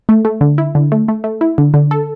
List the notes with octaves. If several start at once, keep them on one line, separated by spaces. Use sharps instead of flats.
A3
A3
D3
E4
D3
A3
A3
A3
E4
D3
D3
A4